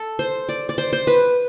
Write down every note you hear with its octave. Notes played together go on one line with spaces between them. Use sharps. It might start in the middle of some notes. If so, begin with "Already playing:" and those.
Already playing: A4
C5
D5
D5
C5
C5
B4